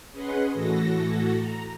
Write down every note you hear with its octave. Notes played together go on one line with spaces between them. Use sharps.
C#4 G#4 B4 D#5 F#5 C6
A2 E3 F#4 A4 A#6
A#5